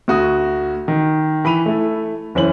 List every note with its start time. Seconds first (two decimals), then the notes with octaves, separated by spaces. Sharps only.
0.08 D2 F#4 D#6
0.88 D#3
1.45 E3 B5 D#7 F7
1.66 A3 E4 A4
2.35 F#1 E3 C#4 C5 F#7